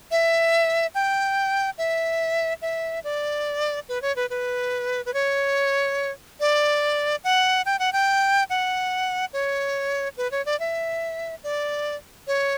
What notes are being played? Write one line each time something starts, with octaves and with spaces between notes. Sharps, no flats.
E5
G5
E5
E5
D5
B4
C#5
B4
B4
B4
C#5
D5
F#5
G5
F#5
G5
F#5
C#5
B4
C#5
D5
E5
D5
C#5